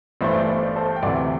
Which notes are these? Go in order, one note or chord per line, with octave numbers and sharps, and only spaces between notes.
G1 G2 E3 A3 D4 C5
D5
C5
D5
A4 C5
G5
D2 C3 E3 D5 F#5